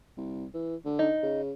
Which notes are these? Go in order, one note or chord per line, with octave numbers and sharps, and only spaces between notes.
C2
E3
D3
D#4
C#3